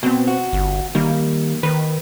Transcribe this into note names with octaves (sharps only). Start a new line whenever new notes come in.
B2 B3 C4
F#4
G1
D#3 G3 A#3
D#3 B4